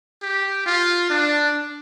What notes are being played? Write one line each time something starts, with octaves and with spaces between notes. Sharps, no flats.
G4
F4
D4